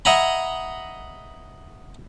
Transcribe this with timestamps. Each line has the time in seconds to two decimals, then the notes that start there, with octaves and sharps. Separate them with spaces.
0.05 D#5 E5 F#5 G#5 A#5 B5